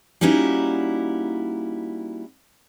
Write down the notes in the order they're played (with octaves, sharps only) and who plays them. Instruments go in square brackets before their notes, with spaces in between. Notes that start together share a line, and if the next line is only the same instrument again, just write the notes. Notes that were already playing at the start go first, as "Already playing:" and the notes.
[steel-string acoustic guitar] G3 A#3 C#4 D#4 E4 F#4